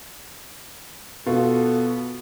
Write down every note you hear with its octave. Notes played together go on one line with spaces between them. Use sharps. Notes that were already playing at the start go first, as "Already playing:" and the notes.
B2 B3 F4 A4